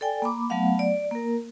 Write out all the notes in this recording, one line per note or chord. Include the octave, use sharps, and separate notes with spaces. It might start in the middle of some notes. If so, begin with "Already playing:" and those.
A4 D5 G5 G#5
A#3 B5 D6
F#3 A3 B3 F5 F#5
D5
A#3 A#4